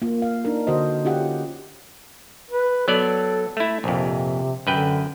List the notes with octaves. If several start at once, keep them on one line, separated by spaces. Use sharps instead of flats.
A#3 F4
F5
D4 D#4 A#4
D3 F#4 C5 D#5
C#4 F4 G4 F#5
B4
F#3 B3 A4 D5
A3 E4
A#1 F2 C3
F#2 D3 B4 G5